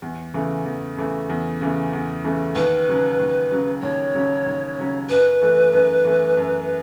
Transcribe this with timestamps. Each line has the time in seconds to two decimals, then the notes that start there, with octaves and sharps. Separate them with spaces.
0.02 E2
0.34 C#3 E3 A3
0.66 E2
0.97 C#3 E3 A3
1.30 E2
1.61 C#3 E3 A3
1.93 E2
2.24 C#3 E3 A3
2.55 D#2 B4
2.88 C#3 F#3 C#4
3.19 D#2
3.51 C#3 F#3 C#4
3.82 D#2 C#5
4.15 C#3 F#3 C#4
4.46 D#2
4.78 C#3 F#3 C#4
5.09 F#2 B4
5.42 E3 A3
5.73 F#2
6.05 E3 A3
6.37 F#2